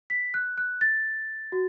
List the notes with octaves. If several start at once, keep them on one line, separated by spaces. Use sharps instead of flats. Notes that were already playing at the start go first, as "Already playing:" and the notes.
B6
F#6
F#6
A6
F#4